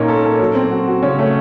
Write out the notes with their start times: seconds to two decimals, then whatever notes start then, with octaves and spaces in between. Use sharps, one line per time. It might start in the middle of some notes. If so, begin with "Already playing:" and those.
Already playing: A#2 A#3 C#4 D#4
0.08 A4
0.25 A4
0.40 F#3
0.55 C4
0.71 F#4
0.87 F#4
1.03 C#3 C#4
1.19 A3